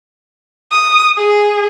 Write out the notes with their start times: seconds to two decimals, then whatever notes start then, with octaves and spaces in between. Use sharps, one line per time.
0.71 D#6
1.17 G#4